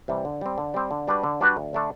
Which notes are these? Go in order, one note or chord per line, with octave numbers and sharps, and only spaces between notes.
C3 E3 G3
D3
G3 C4
D3
G3 C4
D3
G3 D4 F#4 B4
D3
G3 D4 F#4 B4
D2
D3 A3 D4 A4